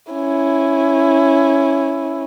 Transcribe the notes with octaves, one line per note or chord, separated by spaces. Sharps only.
C#4 E4